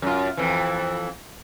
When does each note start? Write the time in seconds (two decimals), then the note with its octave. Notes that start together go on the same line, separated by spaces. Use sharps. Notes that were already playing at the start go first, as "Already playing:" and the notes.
0.02 F#2 F4
0.37 F2 E3